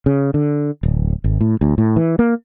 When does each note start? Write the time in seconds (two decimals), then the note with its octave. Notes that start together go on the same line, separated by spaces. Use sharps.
0.06 C#3
0.34 D3
0.83 D1
1.24 G#1
1.41 A2
1.61 D2
1.78 A2
1.96 E3
2.19 A#3